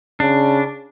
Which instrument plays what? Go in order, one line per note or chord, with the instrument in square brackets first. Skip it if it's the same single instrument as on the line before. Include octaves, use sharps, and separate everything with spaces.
[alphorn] C#3 [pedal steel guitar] D4